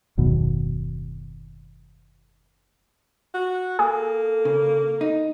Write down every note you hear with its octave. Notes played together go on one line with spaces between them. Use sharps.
F#1 D#2 B2
F#4
A#3 G#4 A4
C#3
D#4